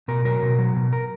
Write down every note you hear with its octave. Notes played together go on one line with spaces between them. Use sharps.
B2 A#4
F#3 A#4
B2
F#3
B2
A#4